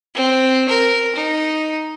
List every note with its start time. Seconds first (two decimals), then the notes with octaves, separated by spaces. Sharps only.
0.15 C4
0.69 A#4
1.16 D#4